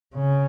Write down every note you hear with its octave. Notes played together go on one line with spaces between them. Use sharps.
C#3